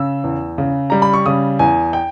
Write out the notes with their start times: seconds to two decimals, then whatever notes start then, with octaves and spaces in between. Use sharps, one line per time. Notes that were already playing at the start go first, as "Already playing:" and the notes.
Already playing: C#3 E6
0.24 E2
0.58 C#3
0.90 G3 A#5
1.02 B5
1.14 C#6
1.26 C#3 D#6
1.59 E2 G#5
1.93 G5